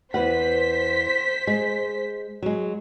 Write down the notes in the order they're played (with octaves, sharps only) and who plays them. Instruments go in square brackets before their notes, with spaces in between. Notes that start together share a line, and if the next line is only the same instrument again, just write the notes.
[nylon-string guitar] E2 B4 F#5 [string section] C5 B6
[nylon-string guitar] G#3
F#3 G#3